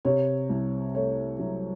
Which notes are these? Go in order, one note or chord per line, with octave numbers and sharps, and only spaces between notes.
C3 C#5
C2
A3 C#5
F#3